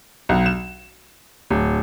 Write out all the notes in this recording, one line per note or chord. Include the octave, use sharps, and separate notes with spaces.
B1
E7
D1